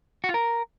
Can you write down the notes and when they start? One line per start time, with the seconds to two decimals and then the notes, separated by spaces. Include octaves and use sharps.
0.24 F#4
0.29 F4
0.34 A#4